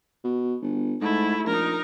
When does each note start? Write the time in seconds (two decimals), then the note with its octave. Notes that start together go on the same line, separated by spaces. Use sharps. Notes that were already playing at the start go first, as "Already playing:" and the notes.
0.24 B2
0.62 G1
1.01 G#2 A3 E4
1.46 A#1 D#4 A#4